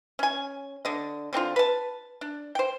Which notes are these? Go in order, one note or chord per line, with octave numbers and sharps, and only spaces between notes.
C#4 G#5
D3 D#5
D3 C4 D4 F4
B4 A5
D4
C5 G5